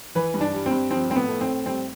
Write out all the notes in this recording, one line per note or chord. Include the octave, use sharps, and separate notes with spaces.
E3 B4
G2
D4
G3
C4
G2
F3 C4
A2 C4
B3
A3
C4
A2
G3 C4